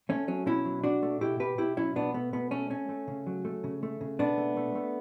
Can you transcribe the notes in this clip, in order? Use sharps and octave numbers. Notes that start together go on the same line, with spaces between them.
A3 C#4
F#3 C#4
B2 C#4 E4
F#3
B2 D4 F#4
A3
B2 E4 G4
B2 G4 B4
B2 E4 G4
F#3 C#4 E4
B2 B3 D4
A3 B3
B2 B3
A3 C#4
A3 C#4
A3
C#3
F#3
A3
C#3
A3
C#3
B2 B3 D4
A3
A3
A3